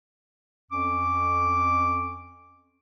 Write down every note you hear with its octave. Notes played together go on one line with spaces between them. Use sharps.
F2 C#4 D6